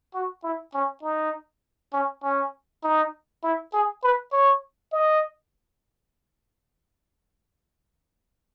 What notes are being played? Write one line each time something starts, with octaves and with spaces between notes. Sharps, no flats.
F#4
E4
C#4
D#4
C#4
C#4
D#4
E4
G#4
B4
C#5
D#5